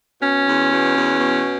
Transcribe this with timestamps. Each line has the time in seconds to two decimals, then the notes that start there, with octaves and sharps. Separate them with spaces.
0.21 B2 C#4
0.45 E2
0.70 B2
0.94 E2
1.19 B2